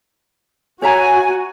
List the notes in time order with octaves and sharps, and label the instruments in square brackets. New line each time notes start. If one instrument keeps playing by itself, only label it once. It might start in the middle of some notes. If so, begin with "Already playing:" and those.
[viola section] F#4 [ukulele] C#5 E5 A#5 [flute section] G#5